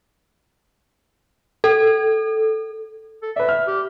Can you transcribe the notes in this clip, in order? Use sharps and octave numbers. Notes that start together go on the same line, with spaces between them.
A4
A4
B4 D5 E5
F6
G4